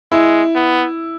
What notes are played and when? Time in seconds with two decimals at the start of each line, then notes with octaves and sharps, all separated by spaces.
0.11 G#3 E4
0.55 B3